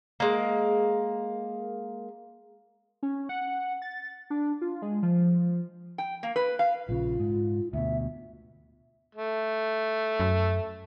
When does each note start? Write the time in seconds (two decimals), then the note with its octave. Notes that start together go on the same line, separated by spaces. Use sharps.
0.20 G#3 A#3
3.03 C#4
3.29 F#5
3.82 A6
4.30 D4
4.62 F4
4.82 G#3
5.03 F3
5.98 G5
6.23 A#3
6.36 B4
6.59 F5
6.89 A#1 C#3 F4
7.19 G#2
7.73 D2 B2 E5
9.15 A3
10.20 F#2